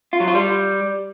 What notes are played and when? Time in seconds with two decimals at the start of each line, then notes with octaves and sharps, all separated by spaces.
0.13 F4
0.20 F#3
0.28 F4
0.35 G3